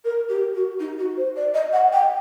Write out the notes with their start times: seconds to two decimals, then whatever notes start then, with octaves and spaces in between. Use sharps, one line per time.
0.04 A#4
0.29 G4
0.55 F#4
0.79 D#4
0.98 F#4
1.17 C5
1.36 D5
1.54 D#5
1.73 F#5
1.92 G5